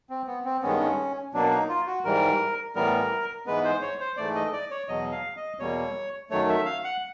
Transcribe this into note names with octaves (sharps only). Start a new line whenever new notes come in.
C4
B3
C4
G2 D#3 G#3 B3 C#4
B2 F#3 A#3 D4
D#4
F4
F#4
G#2 E3 G3 A#4
A2 E3 G3 B3 A#4
G#2 E3 G#3 B3 B4
C5
C#5
C5
G#2 E3 A3 D5
D#5
D5
C#5
E2 B2 F#3 D#5
F5
D#5
E2 B2 G3 A#3 C#5
F#2 D#3 F#3 A3 C#5
E5
F5
F#5